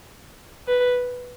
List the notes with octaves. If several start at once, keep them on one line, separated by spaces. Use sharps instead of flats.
B4